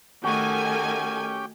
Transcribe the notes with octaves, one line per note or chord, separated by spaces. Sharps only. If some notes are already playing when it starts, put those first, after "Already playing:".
D#3 A3 C#4 F#4 G4 G5 G#5